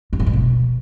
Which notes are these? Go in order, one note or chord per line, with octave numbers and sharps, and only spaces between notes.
G2
A#2
G#2
B2